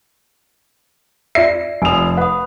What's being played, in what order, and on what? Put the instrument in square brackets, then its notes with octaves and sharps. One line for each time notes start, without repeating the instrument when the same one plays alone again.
[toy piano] F4 D5 E5 [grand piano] C7
[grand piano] F1 F7 [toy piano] G#5 D#6
[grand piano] B4 [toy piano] F#5 D#6